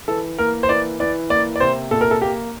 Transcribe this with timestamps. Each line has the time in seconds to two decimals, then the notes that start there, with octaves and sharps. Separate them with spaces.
0.08 E3 A4
0.39 A#3 A#4
0.63 C5
0.69 E3 D5
1.00 E3 D5
1.30 A#3 D5
1.56 D5
1.60 C3 C5
1.91 A#2 A4
2.01 A#4
2.11 A4
2.22 A#3 G4